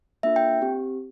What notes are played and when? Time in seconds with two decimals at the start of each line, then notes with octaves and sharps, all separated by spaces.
0.23 A#3 D4 F4 A4 E5
0.36 G5
0.62 C4 G4